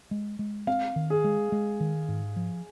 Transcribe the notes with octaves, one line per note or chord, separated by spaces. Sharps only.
G#3
G#3
C4 F5
D#3
G#4
G#3
G#3
D#3
G#2
F3